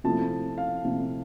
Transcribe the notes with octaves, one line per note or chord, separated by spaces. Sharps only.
C3 F3 A3 C4 E4 A5
F5
C3 F3 A3 C4 E4